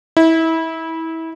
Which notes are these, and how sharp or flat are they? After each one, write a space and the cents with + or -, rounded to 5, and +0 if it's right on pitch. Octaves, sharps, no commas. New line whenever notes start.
E4 -25